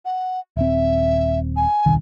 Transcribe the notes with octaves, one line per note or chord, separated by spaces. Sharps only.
F#5
D#1 C4 E5
G#5
D#1 C2 D#3